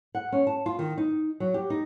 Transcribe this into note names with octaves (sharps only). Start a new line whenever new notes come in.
F#5
C#4
A5
F4
D#3
D#4
F#3
G4
D#4